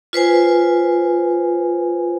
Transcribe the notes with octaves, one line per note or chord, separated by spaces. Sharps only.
F4 B4 C5 G#5